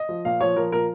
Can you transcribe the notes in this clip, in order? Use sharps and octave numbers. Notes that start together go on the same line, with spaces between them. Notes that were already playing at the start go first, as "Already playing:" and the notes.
Already playing: D#5
F3
A#2 F5
F3 C#5
F3 A#4
A#2 A#4